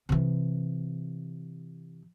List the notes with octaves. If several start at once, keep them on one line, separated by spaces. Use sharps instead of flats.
C3 E3